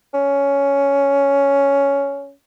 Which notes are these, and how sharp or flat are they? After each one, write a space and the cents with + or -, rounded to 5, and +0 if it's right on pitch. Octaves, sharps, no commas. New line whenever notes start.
C#4 +10